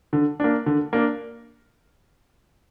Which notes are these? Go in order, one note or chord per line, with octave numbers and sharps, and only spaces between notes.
D3
A#3 D4
D3
A#3 D4